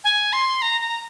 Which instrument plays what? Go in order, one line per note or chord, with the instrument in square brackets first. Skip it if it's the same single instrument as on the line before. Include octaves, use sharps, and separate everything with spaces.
[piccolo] G#5
C6
A#5
A#5